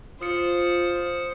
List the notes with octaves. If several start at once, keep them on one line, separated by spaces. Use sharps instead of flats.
F4 C5 D#6 C#7